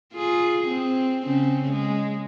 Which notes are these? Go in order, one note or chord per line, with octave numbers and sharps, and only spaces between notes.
F4 G#4
C4
C#3 C4 C#4
G#3